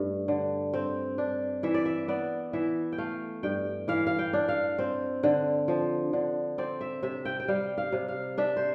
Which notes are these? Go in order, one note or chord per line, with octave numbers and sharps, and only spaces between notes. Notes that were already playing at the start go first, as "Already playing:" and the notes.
Already playing: G2 A3
D3
C4
D4
E3 E5
D5
E5
B3 D5
E3 E5
G5
A3 F5
G2 G5
E3 F5
F5
G5
D4
F5
C4
D3
F3
D3
C4 D5
E5
C3 E5
G5
G5
G3 F5
F5
C3
F5
D4 E5
C5